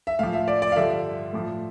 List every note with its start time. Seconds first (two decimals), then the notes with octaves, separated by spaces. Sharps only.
0.07 E5
0.19 A2 F3 F5
0.33 E5
0.48 D5
0.62 D5
0.72 F5
0.76 G2 D3 F3 E5
1.33 A2 F3